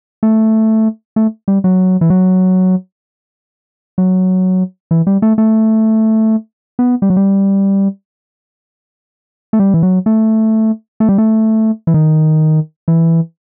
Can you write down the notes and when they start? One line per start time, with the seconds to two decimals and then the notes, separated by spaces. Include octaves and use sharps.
0.23 A3
1.16 A3
1.48 G3
1.64 F#3
2.01 E3
2.10 F#3
3.98 F#3
4.91 E3
5.07 G3
5.22 A3
5.38 A3
6.79 B3
7.02 G3
7.10 F#3
7.16 G3
9.53 A3
9.59 G3
9.74 E3
9.83 F#3
10.06 A3
11.00 A3
11.09 G3
11.18 A3
11.87 E3
11.94 D#3
12.88 E3